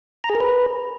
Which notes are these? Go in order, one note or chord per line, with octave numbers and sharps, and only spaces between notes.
A#5
G#4
A#4
B4